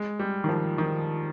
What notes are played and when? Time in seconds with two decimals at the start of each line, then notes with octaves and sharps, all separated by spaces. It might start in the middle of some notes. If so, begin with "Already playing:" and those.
Already playing: G#3
0.19 G3
0.44 D#3
0.49 F3
0.78 D#3